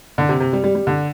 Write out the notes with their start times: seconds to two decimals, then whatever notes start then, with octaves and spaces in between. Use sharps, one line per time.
0.18 D3
0.29 C3
0.40 C3
0.53 G3
0.64 G3
0.75 G3
0.87 D3